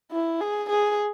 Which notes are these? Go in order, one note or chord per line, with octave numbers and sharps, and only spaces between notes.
E4
G#4
G#4